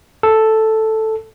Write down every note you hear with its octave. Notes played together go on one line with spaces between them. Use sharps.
A4